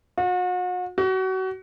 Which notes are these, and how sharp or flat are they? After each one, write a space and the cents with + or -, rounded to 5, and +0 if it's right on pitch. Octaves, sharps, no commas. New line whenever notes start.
F#4 -40
F#4 +30